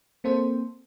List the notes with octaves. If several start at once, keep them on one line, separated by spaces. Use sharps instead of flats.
A#3 C4 A4 C5